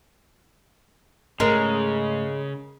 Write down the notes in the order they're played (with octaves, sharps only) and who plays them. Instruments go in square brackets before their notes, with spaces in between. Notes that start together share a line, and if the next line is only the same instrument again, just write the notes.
[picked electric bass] G#2 A3 [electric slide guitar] C#3 [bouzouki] G#3 [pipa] A#4